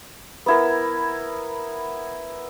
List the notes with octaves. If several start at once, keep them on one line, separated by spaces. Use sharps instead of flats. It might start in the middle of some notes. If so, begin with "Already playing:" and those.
B3 E4 A#4